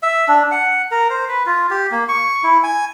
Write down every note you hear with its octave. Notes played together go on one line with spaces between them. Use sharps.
E5
D4
F#5
A#4
C5
B4
F4
G4
A#3
C#6
E4
G#5